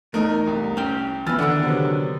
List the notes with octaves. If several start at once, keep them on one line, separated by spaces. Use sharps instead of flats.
E2 A3 D#4 A#4
C2
C#4 G5
E3 B3 E6 F6 A6
D3 D#3 D5 F#5 E6
C3 F#3 B3